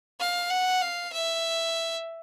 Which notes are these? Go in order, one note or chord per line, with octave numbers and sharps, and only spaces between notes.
F5
F#5
F5
E5